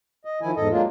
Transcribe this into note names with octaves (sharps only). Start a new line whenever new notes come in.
D#5
D#3 F3 E4 G#5
E2 G#2 A4 D#5
F#3 G#3 A#3 D4 F4